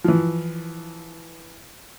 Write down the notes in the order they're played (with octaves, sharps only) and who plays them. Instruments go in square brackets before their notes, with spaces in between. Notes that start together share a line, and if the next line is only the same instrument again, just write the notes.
[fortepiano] E3 F3